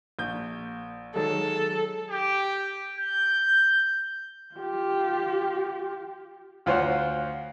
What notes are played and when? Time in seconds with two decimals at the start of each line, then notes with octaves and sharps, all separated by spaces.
0.19 A#1 G6
1.16 D#3 F#3 G#3 A4
2.10 G4
2.98 G6
4.56 F4 G4
6.66 D2 F4 C5 C#5 F#5